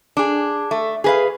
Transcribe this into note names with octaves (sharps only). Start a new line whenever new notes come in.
D4 G#4
A3
G#4 B4 F5